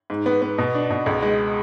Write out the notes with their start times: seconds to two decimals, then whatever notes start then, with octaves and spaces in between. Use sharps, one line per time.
0.10 G#2
0.26 B3
0.42 B3
0.58 B2
0.75 D4
0.90 B2
1.06 C#2
1.22 G#3